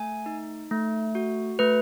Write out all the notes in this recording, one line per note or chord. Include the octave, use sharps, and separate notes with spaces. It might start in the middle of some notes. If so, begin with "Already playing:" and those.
Already playing: A3 G#5
D#4
A3
F#4
A3 B4